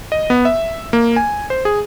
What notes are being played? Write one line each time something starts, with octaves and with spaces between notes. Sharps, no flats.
D#5
B3
E5
A#3
G#5
C5
G#4